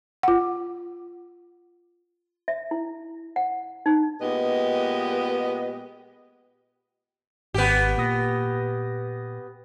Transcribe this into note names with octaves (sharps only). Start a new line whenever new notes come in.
F4 F#5
E5
E4
F#5
D#4
A#2 G#3 B3 G4 B4 D#5
G#1 B3 G4
A#2 D#6 A#6